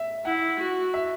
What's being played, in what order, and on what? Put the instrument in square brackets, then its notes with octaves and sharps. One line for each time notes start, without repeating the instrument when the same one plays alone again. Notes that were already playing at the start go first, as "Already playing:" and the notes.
Already playing: [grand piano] E5
[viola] E4 [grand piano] F#5
[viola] F#4
[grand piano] E5